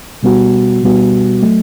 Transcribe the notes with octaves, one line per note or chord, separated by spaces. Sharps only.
B2 G3 B3 F#4
B2 G3 B3 F#4
F#3 A3